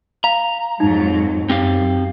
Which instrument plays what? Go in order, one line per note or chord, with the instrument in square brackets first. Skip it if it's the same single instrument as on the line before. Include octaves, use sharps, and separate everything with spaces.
[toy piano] F5 [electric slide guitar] A#5
[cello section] F2 G#2 F#3 [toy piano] D#4
[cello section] F#2 [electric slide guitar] C4 G4 F5